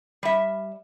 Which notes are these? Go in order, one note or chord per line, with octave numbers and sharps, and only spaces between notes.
G3 E5